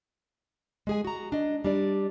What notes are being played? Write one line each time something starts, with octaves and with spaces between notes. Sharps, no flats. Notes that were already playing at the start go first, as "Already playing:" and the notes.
G#3 G#4 G#5
F#4 A#5
D4 D#5
G3 D4 D5